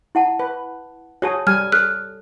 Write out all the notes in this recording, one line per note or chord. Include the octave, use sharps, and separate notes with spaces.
E4 F#5 A5
B4
F#4 G#4 C#5 A5
G3 G#5 F6
A4 F6 F#6